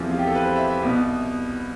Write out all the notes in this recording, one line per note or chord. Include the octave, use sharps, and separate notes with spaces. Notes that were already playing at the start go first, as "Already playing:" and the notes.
Already playing: E2 C3 F3 A4
F4
G4
A4
B4
C5
E5
E5
C2 B2 B3